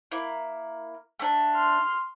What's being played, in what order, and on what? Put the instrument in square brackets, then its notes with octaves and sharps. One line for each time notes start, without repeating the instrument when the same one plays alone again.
[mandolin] A#3 E4
A3 D4
[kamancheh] C6 F6